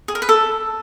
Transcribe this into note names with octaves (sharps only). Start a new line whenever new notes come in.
G#4
A#4
B4
A4